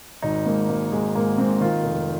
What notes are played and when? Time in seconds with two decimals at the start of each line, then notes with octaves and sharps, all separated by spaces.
0.22 G#1 D#4
0.46 G#2 A#3
0.69 G#2 A#3
0.92 G#1 G#3
1.15 G#2 A#3
1.38 G#2 C4
1.61 D#3 F4
1.84 F1